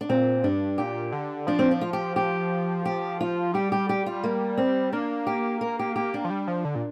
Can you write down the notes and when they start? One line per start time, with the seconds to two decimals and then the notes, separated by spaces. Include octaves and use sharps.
0.01 D4
0.09 A#2 C4
0.44 G2 D4
0.78 A#2 G4
1.12 D3
1.47 F3 D4
1.59 C4
1.71 D4
1.81 F4
1.93 G4
2.16 G4
2.85 G4
3.21 F4
3.54 G3 G4
3.72 G4
3.89 G4
4.06 F4
4.24 A#3
4.58 C4
4.92 A#3 D4
5.27 G4
5.61 A#4
5.79 G4
5.96 G4
6.14 D4
6.24 F3
6.30 G3
6.48 F3
6.65 D3
6.75 A#2